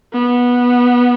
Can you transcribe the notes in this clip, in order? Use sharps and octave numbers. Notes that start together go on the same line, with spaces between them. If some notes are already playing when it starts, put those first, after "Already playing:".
B3